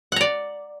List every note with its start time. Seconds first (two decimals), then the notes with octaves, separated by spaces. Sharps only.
0.12 F#5
0.16 A#5
0.21 D5